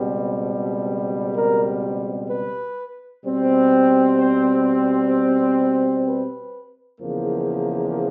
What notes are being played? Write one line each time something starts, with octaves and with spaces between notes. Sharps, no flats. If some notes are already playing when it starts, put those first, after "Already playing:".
Already playing: C#2 B2 G3 C4
A#4
B4
B2 G3 C4
C5
C5
B4
E2 C#3 F3 A#3